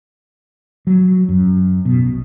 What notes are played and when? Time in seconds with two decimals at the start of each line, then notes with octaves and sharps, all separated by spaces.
0.87 F#3
1.29 F#2
1.85 B2
2.05 A#1